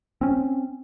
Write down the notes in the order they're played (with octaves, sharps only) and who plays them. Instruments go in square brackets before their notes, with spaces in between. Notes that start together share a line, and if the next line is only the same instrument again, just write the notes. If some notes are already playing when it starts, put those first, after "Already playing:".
[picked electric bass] C4 C#4